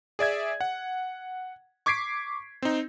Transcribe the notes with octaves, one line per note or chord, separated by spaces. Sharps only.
G#4 D5 E5 G#6
F#5
C#6 D6 G#6 B6 C7 D7
C4 D#4